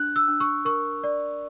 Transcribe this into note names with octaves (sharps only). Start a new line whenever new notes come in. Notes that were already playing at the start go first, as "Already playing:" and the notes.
Already playing: D4 F#6
E6
D4
C#6
A#4 C#6
D5